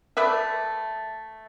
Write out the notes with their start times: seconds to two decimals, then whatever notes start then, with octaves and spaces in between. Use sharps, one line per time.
0.17 A3 B4 D5 E5